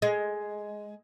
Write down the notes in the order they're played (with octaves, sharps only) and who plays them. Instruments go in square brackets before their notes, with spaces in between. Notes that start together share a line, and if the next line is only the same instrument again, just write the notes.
[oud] G#3